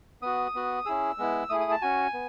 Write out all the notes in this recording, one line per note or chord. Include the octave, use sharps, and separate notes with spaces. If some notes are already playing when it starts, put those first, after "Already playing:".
B3 F#4 D#6
B3 F#4
C#4 E4 G#4 E6
G#3 B3 E4
A3 E4 G#4 D#6
D#6
A5
C#4 F#4 G#5
B3